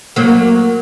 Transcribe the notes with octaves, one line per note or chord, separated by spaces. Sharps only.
F#3 A#3